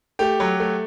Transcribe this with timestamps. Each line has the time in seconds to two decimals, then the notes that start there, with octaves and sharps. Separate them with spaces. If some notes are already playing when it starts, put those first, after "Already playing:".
0.19 A3 G4
0.40 F#3
0.60 A3